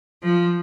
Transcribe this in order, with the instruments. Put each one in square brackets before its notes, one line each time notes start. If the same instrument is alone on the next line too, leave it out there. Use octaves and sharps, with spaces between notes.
[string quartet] F3